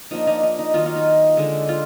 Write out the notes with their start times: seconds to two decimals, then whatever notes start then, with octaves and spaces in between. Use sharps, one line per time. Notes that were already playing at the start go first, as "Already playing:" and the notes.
0.11 F3 A#3 D4 D#4
0.27 D#4
0.43 D#4
0.59 D#4
0.74 D#3 F#3 A#3 D#4 F4
0.86 F4
0.96 D#4
1.37 D3 G#3 D#4
1.69 F4